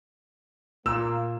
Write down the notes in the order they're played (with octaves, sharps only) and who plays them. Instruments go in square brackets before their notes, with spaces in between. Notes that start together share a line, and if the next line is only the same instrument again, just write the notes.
[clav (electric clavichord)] A#2 [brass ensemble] A#3 [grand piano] E6